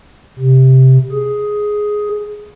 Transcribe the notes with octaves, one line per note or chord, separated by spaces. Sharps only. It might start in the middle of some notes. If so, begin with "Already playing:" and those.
C3
G#4